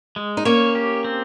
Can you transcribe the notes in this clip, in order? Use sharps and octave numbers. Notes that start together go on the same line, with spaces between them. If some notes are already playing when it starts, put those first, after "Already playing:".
G#3
D#4
A#3 C#4 C#5
G4
C4